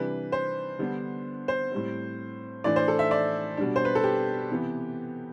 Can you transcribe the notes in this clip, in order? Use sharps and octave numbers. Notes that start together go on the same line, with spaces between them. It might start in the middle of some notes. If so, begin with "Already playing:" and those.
Already playing: C3 E3 G3 D4 B4
C5
D3 G3 B3 D4
C5
A2 G3 C4
A2 E3 A3 D4 D5
C5
A4
E5
D5
B2 G3 D4
C5
B4
A4
G4
C3 E3 B3